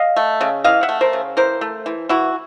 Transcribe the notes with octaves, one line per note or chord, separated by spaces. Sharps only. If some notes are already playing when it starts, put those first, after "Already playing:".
Already playing: D#5 F5
A3
C#3
E3 D#5 F5
E5 F#5
A3
A#4 C5
C#3
E3 A#4 C5
A3
E3
E3 E4 F#4